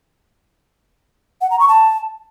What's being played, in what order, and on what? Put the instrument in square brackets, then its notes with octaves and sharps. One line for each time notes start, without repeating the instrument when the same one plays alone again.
[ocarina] F#5
A#5
C#6
A5